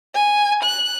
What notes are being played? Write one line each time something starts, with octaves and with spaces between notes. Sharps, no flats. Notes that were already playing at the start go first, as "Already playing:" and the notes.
G#5
F#6